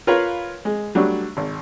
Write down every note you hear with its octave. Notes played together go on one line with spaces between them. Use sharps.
F4 A#4 B4 C#5 F5
G#3
F#3 G3 A3 D4
G#1